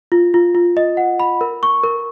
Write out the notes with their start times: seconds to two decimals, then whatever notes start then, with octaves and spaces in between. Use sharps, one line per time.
0.12 F4
0.34 F4
0.55 F4
0.77 D#5
0.97 F#5
1.20 B5
1.41 A#4
1.63 C#6
1.84 A#4